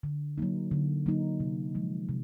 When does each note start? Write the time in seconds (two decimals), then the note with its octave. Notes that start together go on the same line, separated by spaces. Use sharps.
0.03 D3
0.38 F#3 A#3 D#4
0.71 D3
1.06 F#3 A#3 D#4
1.40 C3
1.75 F3 G#3
2.09 C3